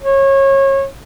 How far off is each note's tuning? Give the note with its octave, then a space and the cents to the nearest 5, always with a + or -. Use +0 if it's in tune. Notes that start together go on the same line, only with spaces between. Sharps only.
C#5 -25